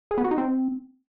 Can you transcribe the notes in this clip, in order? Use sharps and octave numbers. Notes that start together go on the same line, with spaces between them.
G#4
B3
F#4
D#4
C4